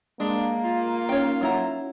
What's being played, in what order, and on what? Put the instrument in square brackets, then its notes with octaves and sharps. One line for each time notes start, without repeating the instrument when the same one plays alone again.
[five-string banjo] G#3 [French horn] A#3 [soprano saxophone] D4 [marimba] F5
[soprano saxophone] F4
[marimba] C#4 D#4 F6 [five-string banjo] C#5 G5
[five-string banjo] F#3 E4 A#5 [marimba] C#5 F#5